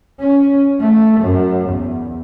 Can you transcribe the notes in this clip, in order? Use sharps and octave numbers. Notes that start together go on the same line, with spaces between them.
C#4
A3
F#2
E2